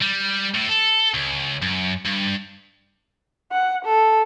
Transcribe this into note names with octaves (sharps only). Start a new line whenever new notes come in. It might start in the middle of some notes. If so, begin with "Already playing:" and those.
G3
A2
A4
C#2
F#2
G2
F#5
A4